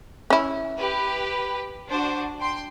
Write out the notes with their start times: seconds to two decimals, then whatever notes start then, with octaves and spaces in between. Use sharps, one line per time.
0.30 C#4 E4
0.78 G4 B4
1.92 D4 F#4 C5
2.39 G5 C6